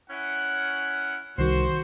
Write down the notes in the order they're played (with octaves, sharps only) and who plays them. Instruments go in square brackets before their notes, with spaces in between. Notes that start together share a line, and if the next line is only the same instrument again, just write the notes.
[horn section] C#4 E4 F#5
[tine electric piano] C2 D#3 [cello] F#4 [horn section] C5